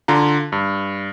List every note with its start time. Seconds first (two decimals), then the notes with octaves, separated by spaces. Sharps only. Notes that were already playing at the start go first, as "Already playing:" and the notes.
0.08 D3 F4 A#5
0.52 G2